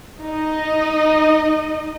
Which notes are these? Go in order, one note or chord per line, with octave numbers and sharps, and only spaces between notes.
D#4 D#5